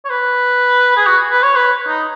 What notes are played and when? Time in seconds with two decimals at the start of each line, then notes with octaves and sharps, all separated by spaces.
0.05 C#5
0.10 B4
0.97 G#4
1.06 F#4
1.31 B4
1.43 C#5
1.56 B4
1.88 D#4